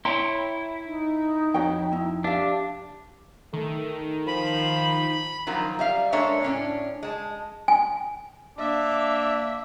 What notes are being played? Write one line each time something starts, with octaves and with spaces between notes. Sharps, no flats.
E4 C#5 G5 A#5 C6
D#4
F2 F#4 C#5 G5
D#4 E4
D4 G4 E5 F5
D#3 A3
F3 B5
D#3 F3 F#3 A#3
G3 E5 F5
G#3 A#3 D4 A4 C#5 E5
A2 C#4 D4
G#3 A5
G#5
A#3 D4 E5